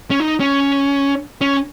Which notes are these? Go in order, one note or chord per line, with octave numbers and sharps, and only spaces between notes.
C#4
D#4
C#4
C#4